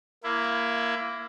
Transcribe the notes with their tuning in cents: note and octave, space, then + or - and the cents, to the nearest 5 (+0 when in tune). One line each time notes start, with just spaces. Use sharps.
A#3 +0 E4 +20